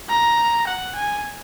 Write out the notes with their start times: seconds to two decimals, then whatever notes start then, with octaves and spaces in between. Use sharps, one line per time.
0.09 A#5
0.67 F#5
0.95 G#5